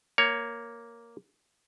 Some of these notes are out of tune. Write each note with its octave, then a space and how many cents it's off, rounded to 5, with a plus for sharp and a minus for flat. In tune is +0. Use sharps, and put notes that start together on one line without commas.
A#3 +0 C#5 +15